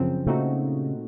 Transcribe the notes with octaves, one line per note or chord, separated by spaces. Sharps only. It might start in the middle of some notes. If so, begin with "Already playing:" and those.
Already playing: F#2 C#3 F3 C4
A#2 C#3 A3 C4 D#4 F#4